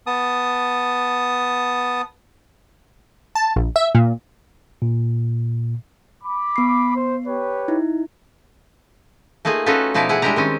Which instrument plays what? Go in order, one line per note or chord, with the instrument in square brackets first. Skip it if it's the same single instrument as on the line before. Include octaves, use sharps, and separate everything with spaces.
[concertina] B3 A5 D#6
[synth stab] A5
A#1
E5
A#2
[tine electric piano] A#2
[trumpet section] B5 D6
[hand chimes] B3 C7
[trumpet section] C5
G4 B4 C#5
[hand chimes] D#4 E4
[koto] A3 A#3 D#4 F4 G#4
C#4 D#4 F4 F#4 A4 B4
B2 F3 D#4 E4 D5 F5
E4 G#4 F#5
G3 G#3 D4 E4 G4 A#5
D#3 C4 C#4